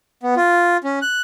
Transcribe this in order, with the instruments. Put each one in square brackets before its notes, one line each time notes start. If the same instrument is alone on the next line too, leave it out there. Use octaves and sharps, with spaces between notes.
[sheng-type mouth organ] B3
F4
C#4
F#6